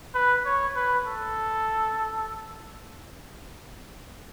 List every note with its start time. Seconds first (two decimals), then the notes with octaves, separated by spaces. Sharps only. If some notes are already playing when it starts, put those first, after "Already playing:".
0.15 B4
0.45 C#5
0.76 B4
1.07 A4